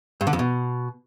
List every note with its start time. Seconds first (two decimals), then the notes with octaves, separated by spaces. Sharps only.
0.21 G2
0.27 D3
0.33 F2
0.39 B2